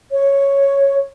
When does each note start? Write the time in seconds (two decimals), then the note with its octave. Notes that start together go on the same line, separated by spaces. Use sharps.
0.12 C#5